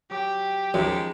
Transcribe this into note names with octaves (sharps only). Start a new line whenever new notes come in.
F#3 G4 D6
F#2 F3 G#3 C#4 D#4